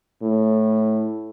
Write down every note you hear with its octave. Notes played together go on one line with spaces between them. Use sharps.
A2